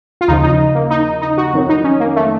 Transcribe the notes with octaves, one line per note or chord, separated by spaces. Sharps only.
F4
D#2 C#3 F3 D#4
D#4
A#3
D#4
D#4
F#4
F2 D#3 F#3
D#4
C#4
A#3
A3